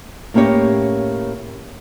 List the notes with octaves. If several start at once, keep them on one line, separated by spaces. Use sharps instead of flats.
A2 A#3 C#4 G4 C#5